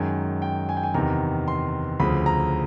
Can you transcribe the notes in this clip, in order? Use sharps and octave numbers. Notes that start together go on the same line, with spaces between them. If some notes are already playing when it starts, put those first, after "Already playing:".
Already playing: F#2 D#3 G#3 G#5
G5
G#5
G5
G#5
E2 C3 D#3 A#5
C6
D2 C#3 F3 B5
A#5